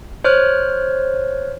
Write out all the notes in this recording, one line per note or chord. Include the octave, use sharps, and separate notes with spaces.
C5 C#5 F6 F#6